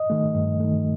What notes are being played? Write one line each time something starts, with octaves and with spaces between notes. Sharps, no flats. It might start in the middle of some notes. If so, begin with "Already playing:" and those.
Already playing: D#5
D#3 A3
G2
D#3 A3